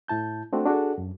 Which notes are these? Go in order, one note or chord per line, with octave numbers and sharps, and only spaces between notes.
A2 E4 A5 G6
A3 C4 D4 F#4
D4 F#4 G#4 A4
F#2